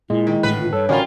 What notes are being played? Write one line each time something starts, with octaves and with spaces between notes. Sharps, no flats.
A#2 G#3 E4
D#3
G#1 A2 D3 B4
F4
G2 A4 C#5
A1 D3 G3 C#4 F4 F#4 A#4